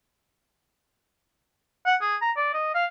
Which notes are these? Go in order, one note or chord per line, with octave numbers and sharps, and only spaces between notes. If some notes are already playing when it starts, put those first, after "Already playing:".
F#5
G#4
A#5
D5
D#5
F5